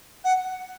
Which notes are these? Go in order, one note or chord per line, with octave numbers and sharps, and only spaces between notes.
F#5